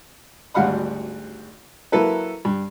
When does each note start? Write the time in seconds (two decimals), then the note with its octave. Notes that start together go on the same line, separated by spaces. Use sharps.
0.54 G#1 D2 G3 F5 F#5 B5
1.92 F#3 A#3 E4 A4 B4
2.45 G2